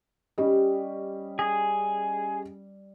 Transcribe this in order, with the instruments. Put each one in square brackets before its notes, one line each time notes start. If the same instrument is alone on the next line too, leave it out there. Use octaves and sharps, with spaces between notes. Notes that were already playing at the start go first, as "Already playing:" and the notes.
[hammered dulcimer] G3 [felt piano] C#4 G4 D#5
[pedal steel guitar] G#4